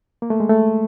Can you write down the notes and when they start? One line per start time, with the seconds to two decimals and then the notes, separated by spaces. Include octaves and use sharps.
0.22 A#3
0.30 A3
0.40 G#3
0.49 A3